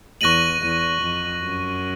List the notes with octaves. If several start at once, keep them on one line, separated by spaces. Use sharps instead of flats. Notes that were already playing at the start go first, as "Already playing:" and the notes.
E2 C#6 F#6 A#6 D#7 F#7
E2
F2
F#2